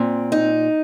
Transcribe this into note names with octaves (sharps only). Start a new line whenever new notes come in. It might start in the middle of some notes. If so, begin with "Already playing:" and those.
Already playing: A#2 C4
D#4